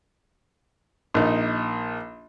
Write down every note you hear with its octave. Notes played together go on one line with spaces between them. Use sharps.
A#1 D#4